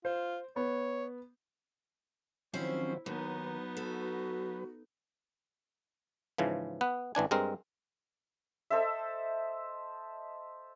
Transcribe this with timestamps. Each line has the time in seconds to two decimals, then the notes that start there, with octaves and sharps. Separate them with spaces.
0.05 F4 C5
0.56 B3 C#5
2.54 D#3 F3 F#3 C4 C#4 E4 C5
3.06 D#2 F#3 B3 D#4 B4 A#5
3.77 F#4 A4
6.38 G#2 C#3 E3 F3
6.81 B3 B4
7.15 A1 E3 D4 G#5
7.31 G2 G#3 C4 A#4
8.70 A4 C5 D#5 E5